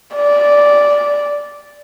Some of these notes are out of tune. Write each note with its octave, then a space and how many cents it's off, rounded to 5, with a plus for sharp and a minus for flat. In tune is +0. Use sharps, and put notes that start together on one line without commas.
D5 -10